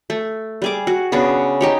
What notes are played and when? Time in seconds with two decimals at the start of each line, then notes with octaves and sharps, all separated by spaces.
0.10 A3
0.62 G3 G#4 D6
0.87 F#4
1.12 C#3 B3 D4 F#4
1.61 D#4 G4 C#5